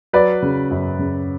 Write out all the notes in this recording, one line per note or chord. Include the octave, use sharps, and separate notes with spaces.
F#3 B4 D5
C#3
F#2
C#3